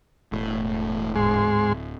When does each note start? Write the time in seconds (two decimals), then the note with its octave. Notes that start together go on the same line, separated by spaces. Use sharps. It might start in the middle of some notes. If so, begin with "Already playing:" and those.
0.32 E1 A2
1.16 D1 G#2 G#3 C6